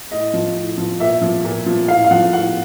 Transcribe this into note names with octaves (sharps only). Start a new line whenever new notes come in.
A2 D#5
F3
A2
F3
A#2 E5
F3
A#2
F3
A2 F5
F5
F3 F#5
A2 F#5